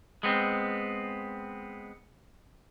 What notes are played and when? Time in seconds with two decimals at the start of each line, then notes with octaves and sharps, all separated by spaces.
0.23 G#3 B3 C4